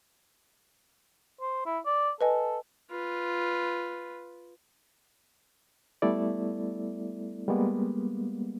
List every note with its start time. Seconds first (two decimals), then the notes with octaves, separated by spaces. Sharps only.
1.41 C5
1.66 E4
1.86 D5
2.21 A4 B4 D#5 G#5
2.91 F4 B4
6.02 G3 A3 B3 E4 A4 D5
7.48 G3 G#3 A#3 B3